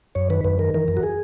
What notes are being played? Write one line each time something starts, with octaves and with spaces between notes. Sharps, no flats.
F#2 C#5
D#3 B4
F#2 B4
D#3 A#4
E3 A#4
F#2
F#4
G#4